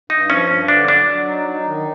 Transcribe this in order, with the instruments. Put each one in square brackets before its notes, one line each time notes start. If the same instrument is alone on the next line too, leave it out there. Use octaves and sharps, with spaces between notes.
[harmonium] G2 [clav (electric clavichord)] D#4
[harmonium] F3 [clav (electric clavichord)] C#4
[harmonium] G2
[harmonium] D3 [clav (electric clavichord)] D4
[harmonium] F#3 [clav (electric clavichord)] D4
[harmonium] F#3
D#4
D#4
D#3